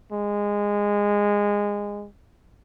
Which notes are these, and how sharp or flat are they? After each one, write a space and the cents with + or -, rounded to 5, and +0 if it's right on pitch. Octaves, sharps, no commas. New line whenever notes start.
G#3 -20